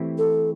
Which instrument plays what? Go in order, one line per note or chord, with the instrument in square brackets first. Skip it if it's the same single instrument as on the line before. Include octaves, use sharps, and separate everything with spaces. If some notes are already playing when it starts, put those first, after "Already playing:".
Already playing: [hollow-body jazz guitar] E3 A3 C4 E4 G4
[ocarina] A4